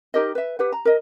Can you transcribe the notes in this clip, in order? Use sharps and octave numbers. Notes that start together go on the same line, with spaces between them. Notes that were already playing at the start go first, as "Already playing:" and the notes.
D#4 G4 A#4 D#5
B4 E5
G4 B4 F#5
A#5
A#4 D#5